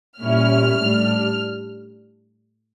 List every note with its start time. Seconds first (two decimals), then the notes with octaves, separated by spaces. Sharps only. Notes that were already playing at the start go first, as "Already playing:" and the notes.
0.20 A#2 G3 C#4 E4 F6
0.75 A2 G3 D4